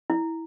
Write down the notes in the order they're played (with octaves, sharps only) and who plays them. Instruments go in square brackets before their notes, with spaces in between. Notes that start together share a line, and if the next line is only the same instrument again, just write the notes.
[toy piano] E4